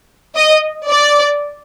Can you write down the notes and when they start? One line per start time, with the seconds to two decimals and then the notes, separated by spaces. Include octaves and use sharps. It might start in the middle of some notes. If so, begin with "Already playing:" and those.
0.35 D#5
0.89 D5